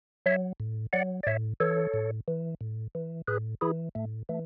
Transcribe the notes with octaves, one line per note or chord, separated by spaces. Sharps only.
F#3 C#5 E5
A2
F#3 D5 F#5
D5
A2 C#5 E5
E3 A4 C#5
A2
E3
A2
E3
A2 G#4 B4
E3 E4 G#4
A2 A3
E3 A3